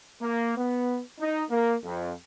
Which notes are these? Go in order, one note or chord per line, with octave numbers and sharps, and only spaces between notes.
A#3
B3
D#4
A#3
F2